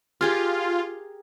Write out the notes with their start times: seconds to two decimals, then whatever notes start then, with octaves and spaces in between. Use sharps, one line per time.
0.21 F4 G4 G#4 A#4